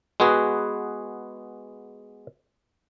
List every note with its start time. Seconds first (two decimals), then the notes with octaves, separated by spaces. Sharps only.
0.20 G#3 B3 F#4 G#4 B4